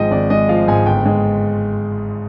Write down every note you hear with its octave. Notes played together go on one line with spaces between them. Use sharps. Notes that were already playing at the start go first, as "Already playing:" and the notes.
Already playing: G#1 G#2 F3 G#3 D#5 G5
G#1 D5
G#3 D#5
F3 F5
G#2 G#5
G1 G5
G#3